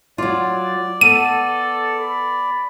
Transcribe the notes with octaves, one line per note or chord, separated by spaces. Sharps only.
F#3 F4 D5
B3 A4 D#7
B5